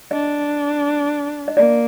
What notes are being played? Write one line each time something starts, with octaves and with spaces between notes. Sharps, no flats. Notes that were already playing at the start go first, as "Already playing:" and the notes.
D4 D#5
D#5
A#3 D5